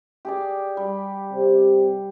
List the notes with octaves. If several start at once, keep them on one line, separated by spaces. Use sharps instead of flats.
G4 G#4 D5
G3
C3